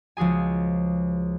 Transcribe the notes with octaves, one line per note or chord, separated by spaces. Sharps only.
C#2 F3 F#4 G#4 G#5